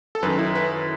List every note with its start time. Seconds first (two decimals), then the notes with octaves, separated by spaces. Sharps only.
0.15 A4
0.23 F#2 D#3 B4
0.38 E4
0.55 B4